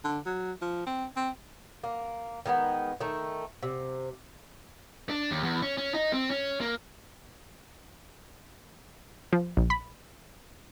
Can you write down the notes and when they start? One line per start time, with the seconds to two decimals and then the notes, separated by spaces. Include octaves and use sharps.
0.04 D3
0.26 F#3
0.62 F3
0.86 C4
1.16 C4
1.83 A#3
2.46 D#3 G#3 A#3 B3
3.00 D#3 A3
3.63 C3
5.10 D4
5.31 D#2
5.43 E2
5.62 C#4
5.78 C#4
5.94 D#4
6.13 C4
6.30 C#4
6.61 A#3
9.33 F3
9.57 A#1
9.70 B5